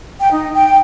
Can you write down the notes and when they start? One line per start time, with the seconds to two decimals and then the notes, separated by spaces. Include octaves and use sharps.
0.20 G5
0.32 D#4
0.54 G5